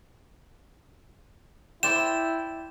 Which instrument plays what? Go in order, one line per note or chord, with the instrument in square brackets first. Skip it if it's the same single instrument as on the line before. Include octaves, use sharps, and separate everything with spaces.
[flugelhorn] E4 [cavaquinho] C5 D5 G5 [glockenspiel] E7